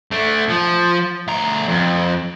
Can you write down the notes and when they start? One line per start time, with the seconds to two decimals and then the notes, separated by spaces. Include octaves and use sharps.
0.11 A3 D4
0.49 F3
1.28 D2 A#5
1.68 F2